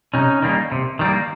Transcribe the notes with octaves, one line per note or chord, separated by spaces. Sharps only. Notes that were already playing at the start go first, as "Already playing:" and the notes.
C3 C#4 D#4
D#3 G3 A#3
C3
D#3 G3 A#3